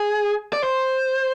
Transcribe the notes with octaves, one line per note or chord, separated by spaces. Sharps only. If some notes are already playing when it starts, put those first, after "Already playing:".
Already playing: G#4
D5
C5